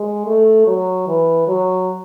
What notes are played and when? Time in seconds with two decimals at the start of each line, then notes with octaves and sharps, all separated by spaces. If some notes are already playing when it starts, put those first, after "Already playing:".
Already playing: G#3
0.27 A3
0.67 F#3
1.08 E3
1.48 F#3